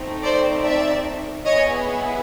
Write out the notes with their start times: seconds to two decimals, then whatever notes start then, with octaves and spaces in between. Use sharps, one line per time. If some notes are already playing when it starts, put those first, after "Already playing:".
Already playing: A3 C4 D#4
0.22 C5 D5
0.63 D5 E5
1.46 B3 E4 G#4 C#5 D#5